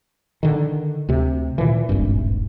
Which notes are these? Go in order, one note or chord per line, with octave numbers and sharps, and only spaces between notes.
D3 D#3
D2 C3
A#2 D#3 E3
D#1 G#1 G2